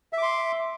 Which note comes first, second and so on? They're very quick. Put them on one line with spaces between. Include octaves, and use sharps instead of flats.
E5 D6 C6